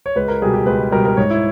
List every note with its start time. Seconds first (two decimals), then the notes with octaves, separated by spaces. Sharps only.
0.06 C#5
0.16 C#2 B4
0.28 A#4
0.42 B2 G3 G#4
0.54 G4
0.66 C#2 B4
0.92 B2 G3 A#4
1.05 A#4
1.17 G#2 C#5
1.30 E4